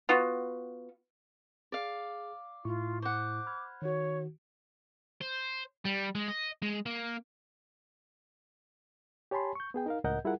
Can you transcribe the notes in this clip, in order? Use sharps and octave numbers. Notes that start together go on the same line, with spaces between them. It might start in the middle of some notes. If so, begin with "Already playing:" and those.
B3 F4 F#4
G#4 D5 F5
A2 E4 F4 C#6
C5 F#5 D6
B5 F6 G#6
D#3 F#4 C#5
C5
G3
G#3
D#5
G#3
A#3
G4 C#5 G#5 A5 B5 C6
C#6 G6
B3 G#4 G5
D#4 A#4 F5
C#2 A2 A#4 D#5 F#5 G6
G3 E4 F4 G#4 A#4 F#5